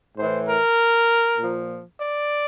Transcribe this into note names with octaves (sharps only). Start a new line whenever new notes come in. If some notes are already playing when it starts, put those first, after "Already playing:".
A2 E3 C5
A#4
A#2 F3
D5